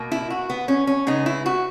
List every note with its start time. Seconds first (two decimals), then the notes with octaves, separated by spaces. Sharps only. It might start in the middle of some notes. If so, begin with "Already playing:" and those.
Already playing: B2 A#3
0.12 E4
0.30 F#4
0.50 B3
0.68 C#4
0.87 C#4
1.07 C#3 G#3 B3 D#4
1.26 E4
1.46 F#4